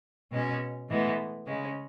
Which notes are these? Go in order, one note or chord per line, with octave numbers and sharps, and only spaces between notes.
B2 G#3 C#4
A2 E3 G#3 B3
C#3 G#3 C#4